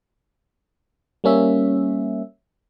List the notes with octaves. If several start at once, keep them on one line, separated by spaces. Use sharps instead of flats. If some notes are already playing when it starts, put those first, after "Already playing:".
G3 A#3 C#4 E5